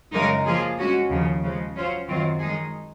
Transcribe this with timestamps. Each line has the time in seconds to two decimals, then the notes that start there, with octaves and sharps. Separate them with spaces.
0.13 F#2 C#3 G#3 D#4 A#4
0.45 F3 A#3 F4 G#4
0.78 G#3 C#4 F#4
1.10 D#2 C#3 F3
1.43 C#3 F3 G#3
1.75 F#3 C#4 F4 C5
2.07 F#2 D#3 F#3 C4 F4
2.39 D#3 G#3 D#4 G#4